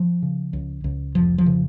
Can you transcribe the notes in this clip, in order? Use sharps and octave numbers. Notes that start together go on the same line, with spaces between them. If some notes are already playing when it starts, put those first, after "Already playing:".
Already playing: F3
C#3
C#2
C#2
F1 F3
F3
C#3